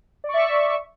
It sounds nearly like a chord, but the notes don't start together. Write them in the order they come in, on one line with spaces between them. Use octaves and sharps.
D5 C#6 E5